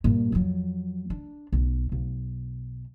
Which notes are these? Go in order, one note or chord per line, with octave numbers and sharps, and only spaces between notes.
G2 A#2
F2 F#3
D4
B1
B1